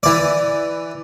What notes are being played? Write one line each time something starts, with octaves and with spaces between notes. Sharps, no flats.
E3 D5